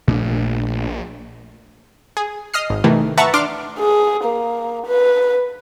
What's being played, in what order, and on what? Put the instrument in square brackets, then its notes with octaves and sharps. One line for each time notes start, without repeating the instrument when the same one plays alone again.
[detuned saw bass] A#1 [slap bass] A#2 A3 D4
[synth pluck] G#4
D#5 D#6 F6 C7
G#1
C3 D#3 E3 A3
B4 E5 F#5 A5 A#5 C#6
D4 C6 D6 F6
[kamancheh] G#4
A#3
B4